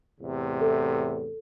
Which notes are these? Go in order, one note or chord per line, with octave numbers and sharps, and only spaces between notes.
E2 A2 C3
A4